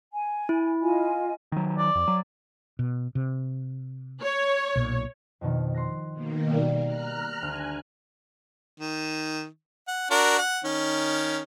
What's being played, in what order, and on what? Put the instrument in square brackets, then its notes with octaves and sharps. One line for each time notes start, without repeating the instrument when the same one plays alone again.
[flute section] G#5
[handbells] E4
[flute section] F4 D#5 G#5
[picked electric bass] D#3 F#3
[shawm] D5
[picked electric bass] F2
F#3
[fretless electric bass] B2
C3
[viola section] C#5
[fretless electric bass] B1 A#2
[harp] F2 B2 D#3
C6 F#6 A#6
[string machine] B2 D#3 A#3
[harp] G3
[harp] G4 [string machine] A#5 F6 F#6
[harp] D2 [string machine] G#5
[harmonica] D#3
F#5
D4 F#4 A#4
F#5
D#3 C#4